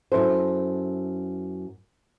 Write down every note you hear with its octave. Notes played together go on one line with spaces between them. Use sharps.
F#2 E4 A4 C5